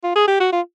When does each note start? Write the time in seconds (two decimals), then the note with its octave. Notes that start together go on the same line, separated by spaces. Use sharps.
0.03 F4
0.16 G#4
0.28 G4
0.40 F#4
0.52 F4